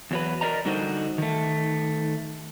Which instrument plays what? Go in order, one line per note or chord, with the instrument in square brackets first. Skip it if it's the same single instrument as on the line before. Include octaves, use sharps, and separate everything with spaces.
[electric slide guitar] E2 F#3 B4
A#4 B4 D5 D#5 A#5
D3 G3 D#4 F#4 C5 D#5
D#3 A3